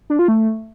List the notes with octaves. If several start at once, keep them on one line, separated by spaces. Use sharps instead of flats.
D4
F4
A3